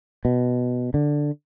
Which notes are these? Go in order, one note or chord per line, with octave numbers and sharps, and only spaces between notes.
B2
D3